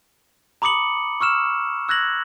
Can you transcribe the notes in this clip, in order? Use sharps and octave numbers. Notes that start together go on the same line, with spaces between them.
A#5 B5 D6 D#6 C#7 F#7
C#6 E6 F6 E7
E6 F#6 G#6 A#6 F#7